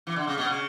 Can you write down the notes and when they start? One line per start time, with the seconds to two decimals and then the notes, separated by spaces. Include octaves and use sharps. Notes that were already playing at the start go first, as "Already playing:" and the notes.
0.07 E3
0.16 D3
0.27 C#3
0.38 B2
0.48 C#3